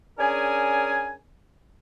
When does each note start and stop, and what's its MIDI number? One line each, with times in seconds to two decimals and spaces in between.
0.19 1.15 61
0.19 1.15 62
0.19 1.15 68
0.19 1.15 70
0.19 1.15 80